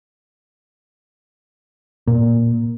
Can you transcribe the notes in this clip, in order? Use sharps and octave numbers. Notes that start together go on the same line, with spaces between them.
A#2